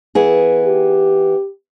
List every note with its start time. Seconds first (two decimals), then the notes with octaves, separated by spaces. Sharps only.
0.15 E3 B3 G#4
0.65 G4